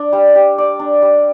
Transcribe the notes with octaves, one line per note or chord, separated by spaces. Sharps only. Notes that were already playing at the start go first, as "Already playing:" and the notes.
Already playing: D4
G3
G4
D5
D4
G3